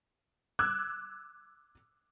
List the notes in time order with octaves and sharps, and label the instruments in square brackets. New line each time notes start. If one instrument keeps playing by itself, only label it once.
[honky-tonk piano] D6 E6 F#6 G#6